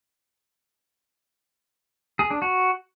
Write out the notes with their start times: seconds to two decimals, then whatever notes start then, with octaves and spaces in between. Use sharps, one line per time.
2.19 G#4
2.30 D4
2.42 F#4